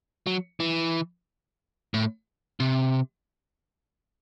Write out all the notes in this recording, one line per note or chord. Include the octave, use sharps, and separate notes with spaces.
F#3
E3
A2
C3